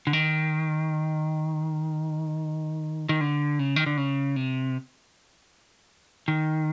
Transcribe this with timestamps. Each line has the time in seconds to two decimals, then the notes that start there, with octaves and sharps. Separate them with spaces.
0.07 D3
0.13 D#3
3.09 D#3
3.21 D3
3.59 C#3
3.76 D#3
3.86 D3
3.97 C#3
4.36 C3
6.28 D#3